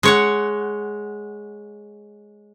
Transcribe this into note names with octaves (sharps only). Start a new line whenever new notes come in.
G#3 C#5 F#5